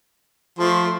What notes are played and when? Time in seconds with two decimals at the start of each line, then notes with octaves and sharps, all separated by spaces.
0.59 F3 A3 C6